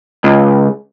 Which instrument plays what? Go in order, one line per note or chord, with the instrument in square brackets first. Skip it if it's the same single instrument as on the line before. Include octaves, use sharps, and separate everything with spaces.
[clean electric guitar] C#2